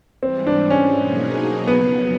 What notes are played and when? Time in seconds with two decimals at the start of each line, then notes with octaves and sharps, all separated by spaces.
0.22 G#2 E3 G3 C4
0.47 D4
0.70 C#4
0.95 B2 F#3 A#3 D#4 G#4
1.67 F2 C#3 F#3 B3